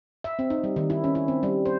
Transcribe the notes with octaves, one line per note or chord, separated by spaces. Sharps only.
E5
C4
D#4
G3
D#3
E4
C#4
E4
C4
G3
C5